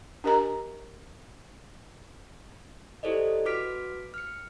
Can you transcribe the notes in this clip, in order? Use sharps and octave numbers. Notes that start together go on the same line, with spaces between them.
D4 G4 A#4 D#5 G#5 A#5
E4 G4 A4 C5 D5 D#5
F#4 B4 D6 F6 B6 D7
F6 C#7